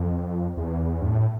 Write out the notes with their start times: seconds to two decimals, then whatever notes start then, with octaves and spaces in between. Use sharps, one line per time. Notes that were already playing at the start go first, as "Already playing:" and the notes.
Already playing: F2
0.57 E2
1.02 G2
1.06 A2